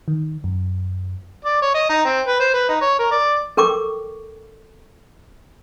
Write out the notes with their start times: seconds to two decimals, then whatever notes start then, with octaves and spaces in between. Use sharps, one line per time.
0.08 D#3
0.44 F#2
1.45 D5
1.62 C#5
1.74 D#5
1.89 D#4
2.05 C4
2.27 B4
2.40 C5
2.54 B4
2.69 D#4
2.81 C#5
2.99 A#4
3.11 D5
3.57 A4 A#4 G5 C#6 D6